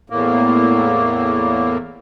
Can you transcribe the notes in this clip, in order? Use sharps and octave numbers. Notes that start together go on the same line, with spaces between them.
E2 A2 A#3